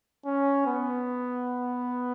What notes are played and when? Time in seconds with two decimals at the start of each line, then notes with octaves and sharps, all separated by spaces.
0.26 C#4
0.66 B3